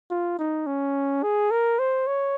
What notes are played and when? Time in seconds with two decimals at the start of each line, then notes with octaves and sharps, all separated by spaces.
0.10 F4
0.39 D#4
0.67 C#4
1.23 G#4
1.51 A#4
1.79 C5
2.07 C#5